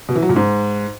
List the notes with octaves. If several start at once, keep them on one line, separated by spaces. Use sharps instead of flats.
B2
E3
F#3
A#2
G#2